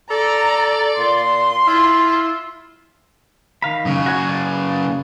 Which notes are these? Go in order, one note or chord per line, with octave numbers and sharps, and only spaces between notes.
A4 D5 A#5
A#2 C6
E4 F4
D#3 F5 B5
F#2 C#3
F#4 C#5
B4 D5